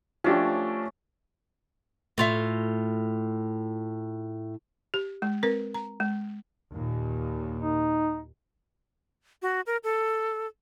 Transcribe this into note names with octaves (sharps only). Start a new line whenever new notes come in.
F3 A3 C#4 D4 G4
A2 F4 E5
G4
G#3
C4 A#4 B4
A#5
G#3
D#2 A#2
D#4
F#4
A#4
A4